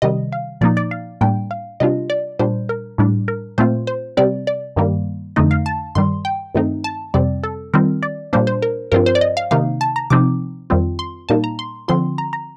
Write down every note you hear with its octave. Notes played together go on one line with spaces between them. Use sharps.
C3 D#3 G3 D#5
F5
A#2 F3 A#3 D#4 D5
D5
F5
A2 G3 A#3 D4 G5
F5
C3 G3 D4 F4 D#5
D5
A#2 G3 D4 C5
A#4
A2 G3 D4
A#4
A#2 A3 C4 F4 C5
C5
C3 G3 C4 D5
D5
G2 D#3 G3 A#3
F2 D3 A3 D#4 D#5
F5
A5
G2 D#3 G3 C6
G5
G2 D#3 A3 C4 D#4
A5
F2 C3 G3 C4 D5
A4
D#3 G3 C4 F4 A#4
D5
A#2 G3 A#3 D4 C5
C5
A#4
G2 F3 C4 F4 A#4
C5
D5
D#5
F5
C3 D#3 A#3 D#4 F5
A5
A#5
C3 F3 C4 D#4 D6
F2 D#3 G3 C4 F4
C6
A#2 G3 A#3 D#4 A5
A#5
C6
D3 F3 C4 F4 C6
A#5
A#5